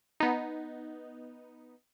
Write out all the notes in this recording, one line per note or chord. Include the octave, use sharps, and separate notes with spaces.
B3 D#4